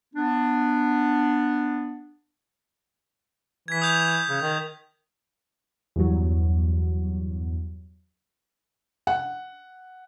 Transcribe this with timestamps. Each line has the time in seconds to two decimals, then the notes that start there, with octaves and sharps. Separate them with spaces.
0.14 B3 D4
3.68 E3 G#6 B6
3.82 D#6 G6 F7
4.29 C#3
4.41 D#3
5.96 E2 G2 F#3
9.07 F#5